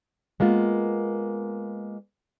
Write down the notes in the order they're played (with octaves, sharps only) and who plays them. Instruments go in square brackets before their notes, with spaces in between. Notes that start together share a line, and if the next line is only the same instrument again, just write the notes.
[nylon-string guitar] G#3 A#3 B3 F4